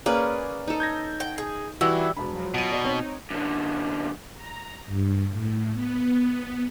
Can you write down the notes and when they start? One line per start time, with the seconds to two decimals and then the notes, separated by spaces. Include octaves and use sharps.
0.06 A#3 C#4 G#4 B4 D5
0.68 D#4 A4
0.80 G6 G#6 A#6
1.20 G5
1.38 G#4
1.81 E3 G3 E4 F#4
2.17 E1 D4 B5
2.33 F3 F#3
2.54 B2 D7 D#7
2.71 D#4 F#4 D5 C#6
2.85 C4 D#4 C#5
3.30 F#2 D3
4.35 A#5
4.87 G2
5.31 A2
5.73 B3